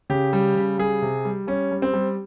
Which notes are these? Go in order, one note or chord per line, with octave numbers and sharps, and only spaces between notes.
C#3 G4
G3
C#3
G3 G#4
C3
G3
G3 C#4
G3
C4
G3